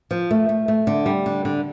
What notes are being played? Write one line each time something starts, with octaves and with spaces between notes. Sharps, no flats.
F3
A3
A3
A3
D3
G3
D3
D3